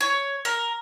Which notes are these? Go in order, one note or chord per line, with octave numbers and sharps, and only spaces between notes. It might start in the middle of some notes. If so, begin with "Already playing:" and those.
C#5
A#4